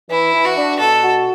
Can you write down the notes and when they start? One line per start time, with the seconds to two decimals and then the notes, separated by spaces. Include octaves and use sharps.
0.10 E3 E4
0.33 E3
0.45 F#4
0.56 D4
0.80 B2 A4
1.03 F#4